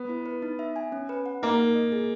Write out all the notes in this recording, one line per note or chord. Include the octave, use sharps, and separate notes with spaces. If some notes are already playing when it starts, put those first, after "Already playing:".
Already playing: B3
E4
B4
D#4
E5
G#5
C#4
B4
F#5
A#3 D#4
A#4
D#5
G#4